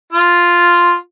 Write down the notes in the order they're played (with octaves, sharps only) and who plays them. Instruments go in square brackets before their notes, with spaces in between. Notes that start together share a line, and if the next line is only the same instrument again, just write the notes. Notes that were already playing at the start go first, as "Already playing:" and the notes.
[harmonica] F4